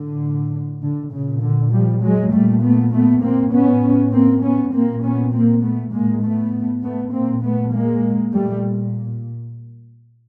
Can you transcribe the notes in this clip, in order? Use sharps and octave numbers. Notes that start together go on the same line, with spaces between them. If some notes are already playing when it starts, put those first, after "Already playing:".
Already playing: A2 D3
D3
A#2 C#3
D3
F3 G3
F#3 G#3
A#2 G3 A3
A3 B3
A3 B3
A#3 C4
A2 B3 C#4
A#3 C4
B3 C#4
A#2 A#3 C4
B3 C#4
A#3 C4
A3 B3
A2 G#3 A#3
A3 B3
A3 B3
A#2 A#3 C4
A3 B3
G#3 A#3
A#2 G3 A3